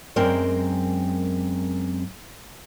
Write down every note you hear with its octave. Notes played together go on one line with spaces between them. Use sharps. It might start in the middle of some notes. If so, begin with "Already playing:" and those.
F#2 G#3 C4 A#4 G5